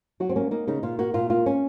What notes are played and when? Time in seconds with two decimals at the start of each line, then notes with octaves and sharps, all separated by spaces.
0.20 F#3 F#4
0.29 C4
0.36 A#3 C#4
0.51 A#3 D#4
0.67 C#3 D#4
0.83 A#2 F4
0.99 A#3 F#4
1.14 A#2 F4
1.30 A#3 F4
1.46 C#4